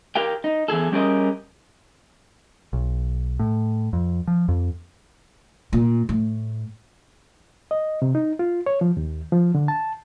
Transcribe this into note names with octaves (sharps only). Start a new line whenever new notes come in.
G4 A#4 F5 G5
D#4
E2 B2 G#4 A4
G3 C#4 G4 G#4 A#4 D#5
B1
A2
F2
F3
F2
A#2
A2
D#5
C3
D#4
F4
C#5
F3
D#2
F3
D3
A5